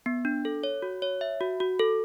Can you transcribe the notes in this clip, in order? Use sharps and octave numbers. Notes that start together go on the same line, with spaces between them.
B3
D4
A4
C#5
F#4
C#5
E5
F#4
F#4
A4